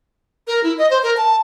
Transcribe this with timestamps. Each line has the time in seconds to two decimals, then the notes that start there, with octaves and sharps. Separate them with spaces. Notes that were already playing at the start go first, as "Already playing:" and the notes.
0.47 A#4
0.64 E4
0.78 D#5
0.90 C5
1.03 A#4
1.17 A5